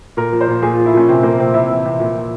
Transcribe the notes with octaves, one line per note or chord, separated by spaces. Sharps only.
A#2 A#4
F3
C5
A#2
A#2 G#4
F4
F3
E4
A#2 C#4
C3 C4
F3 A#3
C3 C4
C3 E4
E3
C3
A#2
F3